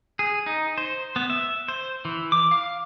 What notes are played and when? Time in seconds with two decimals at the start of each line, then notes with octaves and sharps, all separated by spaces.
0.19 G#4
0.46 D#4
0.78 C5
1.16 B3
1.30 E5
1.68 C5
2.05 E3
2.32 D6
2.51 F5